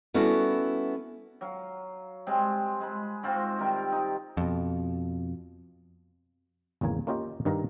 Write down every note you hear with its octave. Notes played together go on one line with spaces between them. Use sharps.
G3 B3 C#4 E4 F#4 A4
F#3 F5
G3 G#3 C4
G#3 B5
G#2 C4 F4 F#4
C3 D#3 G3 A#4
D#4
F2 B2
G#1 E2 C#3 A#3 G#5
A#3 C#4 F4 G4 D#5
G2 D#3 D#4 F5 A#5